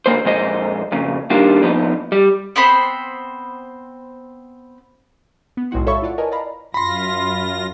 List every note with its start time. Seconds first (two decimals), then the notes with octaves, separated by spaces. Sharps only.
0.06 D2 A#3 C5
0.25 F2 A#2 G#3 C5 D#5
0.92 F2 A#2 C#3
1.30 D#3 G3 A#3 D4 F4
1.61 F2 A#2 F3 B3 D#4
2.12 G3
2.56 B3 C4 C5 B5
5.57 B3
5.71 B1 A2 G#3 E4 F#4 C6
5.87 A4 C#5 E5 F5 B5 C#6
6.02 E4 F4 D5 F#5
6.18 A#4 B4 C#5 D#5 G#5 A5
6.32 D5 D#5 F5 A#5 B5
6.74 F#2 F4 B5 C6 A#6